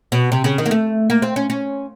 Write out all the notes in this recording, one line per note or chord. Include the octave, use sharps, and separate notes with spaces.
B2
C3
C#3
D#3
A#3
A3
A#3
C4
C#4
C#4